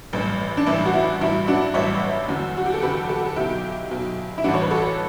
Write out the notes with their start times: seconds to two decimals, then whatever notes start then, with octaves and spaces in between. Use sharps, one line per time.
0.13 A1 G2 E3
0.57 D4
0.67 A1 G2 E3 E4
0.86 F#4
0.94 E4
1.21 A1 G2 F#3 E4
1.47 D4 F#4
1.74 A1 G2 F#3 C#5 E5
2.28 E2 D3 F#3
2.57 F#4
2.66 G4
2.74 A4
2.82 E2 D3 F#3 G4 B4
3.09 F#4 A4
3.26 A4
3.36 B1 B2 F#3 E4 G4
3.90 B1 B2 F#3
4.38 E4
4.44 A1 G2 E3 D4 F#4
4.54 C#5
4.62 B4
4.71 F#4 A4